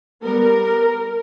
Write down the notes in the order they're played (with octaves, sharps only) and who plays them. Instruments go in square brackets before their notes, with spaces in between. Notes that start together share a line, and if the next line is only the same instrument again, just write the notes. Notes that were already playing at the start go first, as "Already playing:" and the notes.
[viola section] G3 B3 A#4